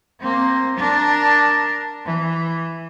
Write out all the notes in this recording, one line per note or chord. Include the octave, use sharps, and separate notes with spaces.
A#3 C4
D4 A#4
E3